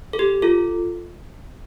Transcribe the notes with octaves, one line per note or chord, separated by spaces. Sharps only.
A4
G4
F4 A4